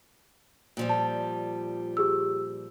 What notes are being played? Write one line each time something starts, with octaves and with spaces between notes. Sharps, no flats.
A#2 F3 G3
A5
G4 G#4 E6